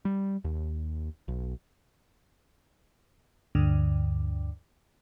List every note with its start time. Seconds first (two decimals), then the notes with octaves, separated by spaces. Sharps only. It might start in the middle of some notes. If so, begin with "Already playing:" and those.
0.05 G3
0.44 D#2
1.28 B1
3.55 D2 G2 D3